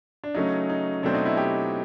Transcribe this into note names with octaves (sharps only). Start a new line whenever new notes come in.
D4
C#3 F#3 A3 C#4 D#4
D#4
B2 F#3 A3 C4 D4
D#4
E4
G4